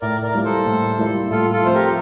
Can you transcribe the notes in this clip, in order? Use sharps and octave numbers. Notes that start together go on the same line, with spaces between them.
A2 A#4 D5
A#4 D5
G3 A#3 E4
A4 C5
A2
G3 A#3 E4
A2 F4 A4
F4 A4
F3 A3 C4 C5
G4 A#4